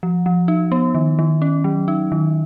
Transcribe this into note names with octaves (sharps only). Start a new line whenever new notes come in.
F3
F3
D#4
B3
D#3
D#3
C#4
F#3
D#4
D#3